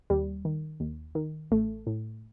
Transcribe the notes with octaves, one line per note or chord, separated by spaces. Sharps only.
D#2 G3
D#3
D#2
D#3
A1 A3
A2